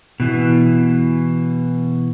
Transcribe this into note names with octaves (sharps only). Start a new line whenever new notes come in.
B2 E3